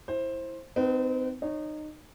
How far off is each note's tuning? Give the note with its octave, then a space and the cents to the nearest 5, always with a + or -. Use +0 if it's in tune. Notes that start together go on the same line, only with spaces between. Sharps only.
E4 +0 C5 +15
C4 -35 D#4 -10 B4 +0
D#4 -25 C#5 -10